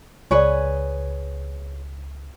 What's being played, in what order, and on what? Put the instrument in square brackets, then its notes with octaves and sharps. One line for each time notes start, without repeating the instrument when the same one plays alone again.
[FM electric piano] C#2 [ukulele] G#4 B4 C#5 [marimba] D5 G#5